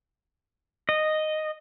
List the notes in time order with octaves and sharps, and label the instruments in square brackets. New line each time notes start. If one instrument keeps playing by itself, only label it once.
[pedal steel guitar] D#5